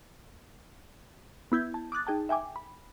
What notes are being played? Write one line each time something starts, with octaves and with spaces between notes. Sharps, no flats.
B3 E4 G6 G#6
A5
D6 D#6 F#6 A6
D#4 G#4 G5 A5
E5 G5 G#5 D6
B5